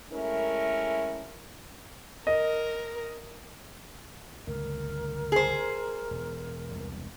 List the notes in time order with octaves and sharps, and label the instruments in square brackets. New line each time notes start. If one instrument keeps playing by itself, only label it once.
[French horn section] G#3 A3 C#4 E4 A#4
[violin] A#4 [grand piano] D#5
[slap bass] G1 C#2 A3 [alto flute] A#4
[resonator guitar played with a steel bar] G#4 C5
[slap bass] E1
E1 C2